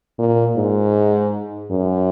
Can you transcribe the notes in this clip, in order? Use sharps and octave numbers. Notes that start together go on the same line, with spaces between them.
A#2
G#2
F#2